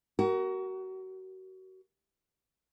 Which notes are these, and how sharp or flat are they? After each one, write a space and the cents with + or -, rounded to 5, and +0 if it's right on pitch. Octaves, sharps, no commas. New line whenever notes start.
F#4 +30 A#4 +0